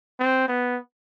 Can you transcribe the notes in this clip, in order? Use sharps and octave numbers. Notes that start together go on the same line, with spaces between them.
C4
B3